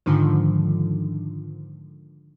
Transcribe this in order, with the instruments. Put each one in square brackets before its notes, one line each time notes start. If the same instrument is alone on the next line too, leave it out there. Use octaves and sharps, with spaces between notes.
[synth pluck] G#2 D3 D#3 F3